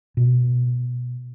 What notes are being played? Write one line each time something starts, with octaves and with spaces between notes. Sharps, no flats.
B2